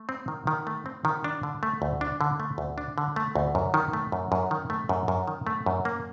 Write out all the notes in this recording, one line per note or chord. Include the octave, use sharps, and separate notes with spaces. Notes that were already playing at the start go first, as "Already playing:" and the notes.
Already playing: A3
C4
D#3
D#3
A3
C4
D#3
D4
D3
A3
D2
D4
D3
A3
D2
D4
D3
A3
D2
F#2
D#3
A3
F#2
F#2
D#3
A3
F#2
F#2
D#3
A3
F#2
A#3